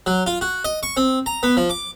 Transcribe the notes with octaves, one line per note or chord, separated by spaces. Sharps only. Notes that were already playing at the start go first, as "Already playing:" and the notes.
F#3
F4
F#4
D#5
C#6
C4
A#5
B3
F3
D6